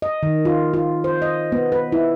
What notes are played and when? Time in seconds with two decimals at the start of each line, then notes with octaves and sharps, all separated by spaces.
0.02 D#5
0.23 D#3
0.45 F4
0.74 F4
1.04 C5
1.22 D#5
1.52 B3
1.72 B4
1.92 E4